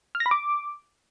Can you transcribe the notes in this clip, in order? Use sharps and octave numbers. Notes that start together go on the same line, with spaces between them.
F6
A#6
B5
D6